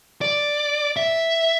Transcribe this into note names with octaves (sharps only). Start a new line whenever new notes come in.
D5
E5